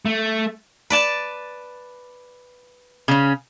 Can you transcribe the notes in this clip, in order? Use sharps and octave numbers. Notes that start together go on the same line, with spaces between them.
A3
B4 D5 A5
C#3 C#4